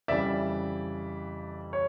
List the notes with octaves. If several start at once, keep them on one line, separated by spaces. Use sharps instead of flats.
F2 C#3 E3 G3 D5 E5
C#5